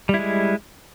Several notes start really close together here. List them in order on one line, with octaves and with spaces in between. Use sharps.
G3 E4 G#3